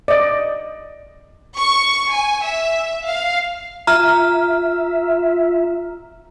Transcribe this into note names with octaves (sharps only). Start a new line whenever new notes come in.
D5 D#5
C#6
G#5
E5
F5
F4 E5 A#5 F6